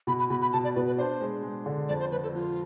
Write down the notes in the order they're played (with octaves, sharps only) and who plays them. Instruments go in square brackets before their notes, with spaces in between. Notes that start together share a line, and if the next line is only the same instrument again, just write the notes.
[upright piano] B2 [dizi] B5
[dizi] B5
[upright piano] B2 [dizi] B5
[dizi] B5
[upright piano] B2 [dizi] A5
[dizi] D5
[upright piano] B2 [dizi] B4
[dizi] B4
[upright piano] D4 [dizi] C5
[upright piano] G#3
G#3
D3
[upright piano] F2 [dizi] D5
[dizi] C5
[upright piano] F3 [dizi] B4
[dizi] A4
[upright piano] F3 [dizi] F4